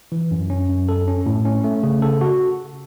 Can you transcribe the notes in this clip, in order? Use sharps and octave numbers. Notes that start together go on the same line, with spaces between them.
E3
F#2
C#4
F#2
A4
C#4
A2
C#4
A3
C#3
A4
F#4